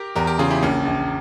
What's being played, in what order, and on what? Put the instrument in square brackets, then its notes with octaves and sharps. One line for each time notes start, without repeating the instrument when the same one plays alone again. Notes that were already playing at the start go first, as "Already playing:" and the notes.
Already playing: [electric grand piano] G4 A#4
[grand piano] E2 [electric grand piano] G4 A#4
[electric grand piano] G4 A#4
[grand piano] C#3 [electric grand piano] F4 G#4
[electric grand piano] E4 G4
[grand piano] A#1 [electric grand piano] A#3 C#4
[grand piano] A#1